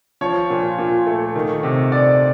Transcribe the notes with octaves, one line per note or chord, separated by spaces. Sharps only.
F3 C#5
A#2
A#2
A3
D#3
C3
C3 D5